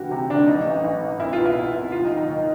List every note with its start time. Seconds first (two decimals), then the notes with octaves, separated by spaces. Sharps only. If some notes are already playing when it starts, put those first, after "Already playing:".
Already playing: D2 E3 F#4 G4
0.11 C3
0.30 D2 D4
0.47 A1 D#4
0.66 A1
0.84 A1
1.01 G#2
1.20 C2 E4
1.33 F4
1.38 B2
1.46 E4
1.57 B2
1.74 C2
1.92 D#2 F4
2.05 D#4
2.11 D#3
2.17 D#4
2.28 D#2